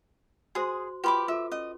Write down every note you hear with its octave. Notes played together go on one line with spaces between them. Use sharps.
F#4 G#4 C5 C6 D#6
F4 G4 B4 B5 C6 D6
F4 A4 E5
C#4 D#5